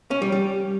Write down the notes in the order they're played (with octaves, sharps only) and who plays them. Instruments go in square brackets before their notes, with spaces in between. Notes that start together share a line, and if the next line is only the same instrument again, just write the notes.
[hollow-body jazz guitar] C#4
G3
G3